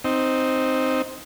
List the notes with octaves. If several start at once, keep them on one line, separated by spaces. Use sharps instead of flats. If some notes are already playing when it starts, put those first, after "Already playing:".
C4 D#4